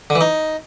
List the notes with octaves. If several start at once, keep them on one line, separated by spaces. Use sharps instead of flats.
D3
E3
D#4